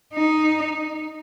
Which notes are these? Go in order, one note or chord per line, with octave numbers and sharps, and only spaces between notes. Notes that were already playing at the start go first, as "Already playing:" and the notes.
D#4